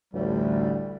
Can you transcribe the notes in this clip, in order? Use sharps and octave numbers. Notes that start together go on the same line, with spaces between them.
A1 D2 G3